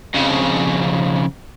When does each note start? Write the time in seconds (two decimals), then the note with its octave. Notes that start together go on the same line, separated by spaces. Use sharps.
0.14 F2 C#3